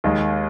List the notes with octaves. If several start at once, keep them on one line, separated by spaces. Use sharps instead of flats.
D#2 D#3 G#3